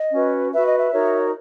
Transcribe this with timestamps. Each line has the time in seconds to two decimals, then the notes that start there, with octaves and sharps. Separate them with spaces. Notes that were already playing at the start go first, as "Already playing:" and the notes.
Already playing: D#5
0.13 C#4 F#4 B4
0.52 F#4 B4 E5
0.65 D#5
0.78 E5
0.92 D#4 F#4 A#4 C#5